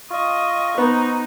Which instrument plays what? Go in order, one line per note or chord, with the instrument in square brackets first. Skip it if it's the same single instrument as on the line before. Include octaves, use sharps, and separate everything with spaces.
[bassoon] F4 [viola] D#5 [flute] C#6
[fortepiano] B3 [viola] D#4 [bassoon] C5